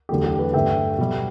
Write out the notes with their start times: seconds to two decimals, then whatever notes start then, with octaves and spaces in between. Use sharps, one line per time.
0.09 E2 D3 F#3 A3 G4
0.24 G4
0.39 G4 B4
0.54 G2 D3 A3 E5 G5
0.98 B2 G3